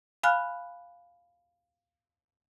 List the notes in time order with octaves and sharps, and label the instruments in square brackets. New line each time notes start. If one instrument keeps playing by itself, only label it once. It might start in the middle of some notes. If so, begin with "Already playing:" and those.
[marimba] F5 G#5 B5 F6 F#6